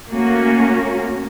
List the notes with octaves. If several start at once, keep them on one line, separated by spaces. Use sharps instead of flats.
A3 A#3 C#4 F#4